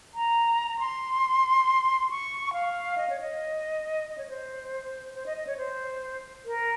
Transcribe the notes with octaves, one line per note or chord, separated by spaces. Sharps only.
A#5
C6
C#6
F5
D#5
C#5
D#5
D#5
C#5
C5
C5
D#5
D#5
C#5
C5
A#4